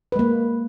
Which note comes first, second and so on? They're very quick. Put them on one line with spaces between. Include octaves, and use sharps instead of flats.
B4 G#3 A#3